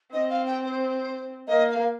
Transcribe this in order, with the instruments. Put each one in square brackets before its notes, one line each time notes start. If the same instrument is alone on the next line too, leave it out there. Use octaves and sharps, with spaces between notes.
[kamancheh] C4 [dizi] D#5
[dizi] F5
G5
C5
[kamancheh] A#3 [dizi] D#5
[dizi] F5